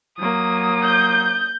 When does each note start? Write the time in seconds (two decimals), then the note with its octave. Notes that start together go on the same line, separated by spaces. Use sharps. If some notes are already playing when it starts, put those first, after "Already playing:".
0.19 F#3 A#3 D#6
0.84 G6